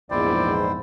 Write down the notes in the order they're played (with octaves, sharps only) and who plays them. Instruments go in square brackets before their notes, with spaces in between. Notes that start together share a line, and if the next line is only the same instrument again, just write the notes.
[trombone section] A#1 G#2 [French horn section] E2 [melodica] E4 C5 G5 [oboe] D5